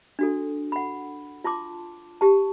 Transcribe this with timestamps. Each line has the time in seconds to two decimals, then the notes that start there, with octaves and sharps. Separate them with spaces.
0.19 D4 F#4 A4
0.72 F#5 B5
1.44 F4 A5 C6 D6
2.21 G4 A5